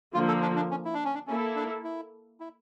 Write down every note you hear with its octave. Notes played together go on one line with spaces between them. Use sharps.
D3 F3 A#3 F4
A4
D4
D4
C#4
E4
D4
C#4
D4
A#3 C#4 E4 A4
D4
E4
E4